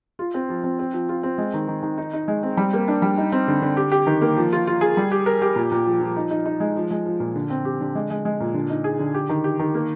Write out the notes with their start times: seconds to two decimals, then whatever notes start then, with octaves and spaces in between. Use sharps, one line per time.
0.19 F4
0.34 C4
0.49 F3
0.64 C4
0.79 C4
0.93 F3
1.09 F4
1.23 C4
1.38 G#3
1.54 D#3
1.68 D#3
1.83 D#3
1.98 D#4
2.13 D#4
2.28 G#3
2.43 C4
2.57 G3
2.73 A#3
2.88 D4
3.02 G3
3.18 D#4
3.32 C4
3.48 D3
3.62 D3
3.77 G4
3.92 G4
4.07 D#3
4.21 A#3
4.37 F3
4.52 F4
4.67 F4
4.81 G#4
4.97 G3
5.12 G4
5.26 A#4
5.42 G4
5.56 A#2
5.71 A#2
5.86 F3
6.01 F3
6.16 D#4
6.31 D#4
6.46 D#4
6.60 G#3
6.76 F3
6.91 G#3
7.06 F3
7.20 A#2
7.36 D3
7.50 C4
7.65 G4
7.81 D3
7.95 G#3
8.10 G#3
8.25 G#3
8.40 A#2
8.54 D3
8.70 D#4
8.84 G#4
8.99 D3
9.14 G4
9.29 D#3
9.44 G4
9.59 D#3
9.74 A#3